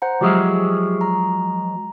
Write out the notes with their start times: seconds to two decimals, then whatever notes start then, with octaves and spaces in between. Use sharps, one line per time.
0.02 C5 F#5 A#5
0.21 F3 F#3 G#3 G4 G#4 E5
1.01 A#5